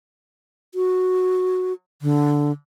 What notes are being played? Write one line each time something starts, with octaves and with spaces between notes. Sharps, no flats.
F#4
D3